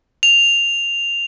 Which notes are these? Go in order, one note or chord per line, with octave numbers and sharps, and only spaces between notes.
F7